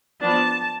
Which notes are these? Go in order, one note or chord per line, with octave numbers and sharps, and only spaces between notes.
F3 B3 D4 A5